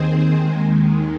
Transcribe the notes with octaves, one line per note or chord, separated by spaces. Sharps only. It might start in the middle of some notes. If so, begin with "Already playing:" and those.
Already playing: D#2 D#3 C4 G#4 C5
D#2 D#3 G#3